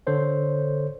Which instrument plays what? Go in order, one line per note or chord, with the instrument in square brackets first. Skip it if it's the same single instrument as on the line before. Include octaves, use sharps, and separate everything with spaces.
[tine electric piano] D3 A4 C5 C#5